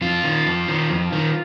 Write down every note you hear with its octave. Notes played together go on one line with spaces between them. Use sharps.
F2 F4
D#3
F2
D#3
F2
D#3